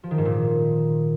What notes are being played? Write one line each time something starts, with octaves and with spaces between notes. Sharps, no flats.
F3
D#3
G#2
A#2